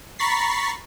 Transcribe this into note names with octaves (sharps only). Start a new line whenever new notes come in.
A#5 B5 C#6 A6 B6 C7